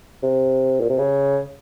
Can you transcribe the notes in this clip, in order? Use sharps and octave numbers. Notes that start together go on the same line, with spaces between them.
C3
A#2
C3
C#3